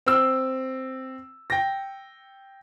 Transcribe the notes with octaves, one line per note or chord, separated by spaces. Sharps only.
C4 E6
G5 A#6